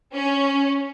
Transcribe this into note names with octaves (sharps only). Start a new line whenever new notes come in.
C#4